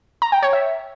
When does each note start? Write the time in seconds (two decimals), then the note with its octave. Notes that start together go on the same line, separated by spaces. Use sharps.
0.22 A#5
0.32 G5
0.43 C#5
0.53 E5